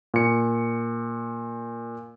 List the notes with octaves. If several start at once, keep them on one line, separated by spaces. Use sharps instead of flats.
A#2 C#7